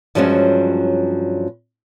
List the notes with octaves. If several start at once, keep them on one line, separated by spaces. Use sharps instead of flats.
G2 F3 F#3 G#3 B3 C#4